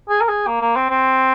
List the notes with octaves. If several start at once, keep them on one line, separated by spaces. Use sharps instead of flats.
G#4
A#4
G#4
A#3
A#3
C4
C4